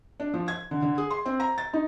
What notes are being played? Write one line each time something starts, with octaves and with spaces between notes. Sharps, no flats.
D4
F3
G#6
D3
D3
G#4
C6
C4
A#5
A6
D#4